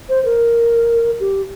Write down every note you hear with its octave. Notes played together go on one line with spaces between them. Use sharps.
C5
A#4
G4